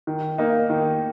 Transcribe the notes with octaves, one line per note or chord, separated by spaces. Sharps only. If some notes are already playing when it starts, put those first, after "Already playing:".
D#3
A#3 D#4
D#3